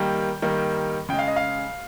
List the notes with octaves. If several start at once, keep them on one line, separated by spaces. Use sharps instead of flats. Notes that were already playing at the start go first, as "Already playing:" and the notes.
Already playing: D#3 G3 A#3 G5
D#3 G3 A#3
C#3 G#3 G5
F5
D#5
F5